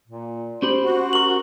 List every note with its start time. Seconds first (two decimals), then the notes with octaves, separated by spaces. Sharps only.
0.08 A#2
0.62 C#4 G4 C5 B5
0.84 F#4
1.13 A#4 C#6 F#7